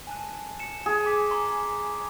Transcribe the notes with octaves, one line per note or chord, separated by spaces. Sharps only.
G#5 A5 F#6
C#7 E7
G#4
G#5 D6 B6
A#5 C6 D6